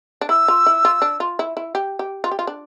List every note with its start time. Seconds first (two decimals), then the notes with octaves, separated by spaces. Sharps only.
0.21 D4
0.29 E4 E6
0.48 F4
0.66 E4
0.85 F4
1.02 D4
1.20 F4
1.39 E4
1.57 E4
1.75 G4
1.99 G4
2.24 F4
2.31 G4
2.39 F4
2.47 D4